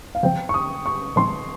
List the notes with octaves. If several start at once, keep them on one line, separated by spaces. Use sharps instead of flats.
F5
C#3 F3 C4 G5
C#6
D#6
C#6
A#2 F3 G#3 C4 D#4 C6